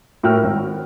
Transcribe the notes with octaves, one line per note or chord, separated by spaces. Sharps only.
A2 F#4 A#4 G5 E6 F6
G#1